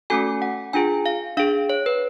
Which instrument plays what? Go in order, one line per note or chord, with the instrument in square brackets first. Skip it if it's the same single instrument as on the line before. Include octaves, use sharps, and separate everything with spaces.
[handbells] A3 C#4 F#4 A4 G#5
F#5
D4 F4 G#4 G#5
F5
D4 G#4 F5
C#5
B4